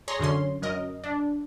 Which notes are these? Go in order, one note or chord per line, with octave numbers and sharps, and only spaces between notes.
G#4 C#5 A#5 C6 A#6
F#2 D3 C#4 C6
F#2 A#4 D#5
D4